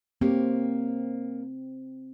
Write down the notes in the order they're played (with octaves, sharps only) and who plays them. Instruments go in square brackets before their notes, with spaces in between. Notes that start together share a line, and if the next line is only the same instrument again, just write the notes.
[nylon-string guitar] A#3 G4 C#5 [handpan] C4